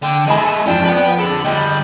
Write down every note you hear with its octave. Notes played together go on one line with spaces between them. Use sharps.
D3 G5
G#3 A3 D#5 G#5 A5 B5
F2 F3 C#4 D5 G5 A5
B4 F#5
D4 G#4 A4 B5
D3 G3 D#5 G5